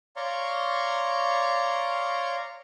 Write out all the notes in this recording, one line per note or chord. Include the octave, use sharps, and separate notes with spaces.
C#5 D5 F5 A#5 C6 C#6